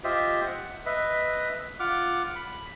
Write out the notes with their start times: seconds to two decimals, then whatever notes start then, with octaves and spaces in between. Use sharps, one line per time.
0.04 F4 G4 C5 D#5 E5
0.46 F#5
0.86 B4 D#5 E5
1.80 F4 F#5 D6 F6
2.36 B5